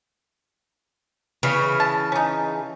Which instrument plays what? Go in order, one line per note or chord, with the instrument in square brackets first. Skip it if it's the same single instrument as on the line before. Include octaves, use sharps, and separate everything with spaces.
[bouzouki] C#3 E3
[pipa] A5
C#4 D#4